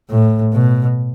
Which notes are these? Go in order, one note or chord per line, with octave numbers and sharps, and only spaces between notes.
A2
B2